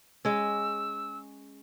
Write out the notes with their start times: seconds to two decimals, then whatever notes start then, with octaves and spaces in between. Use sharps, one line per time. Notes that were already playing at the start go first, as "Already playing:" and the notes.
0.25 G#3 C#4 E6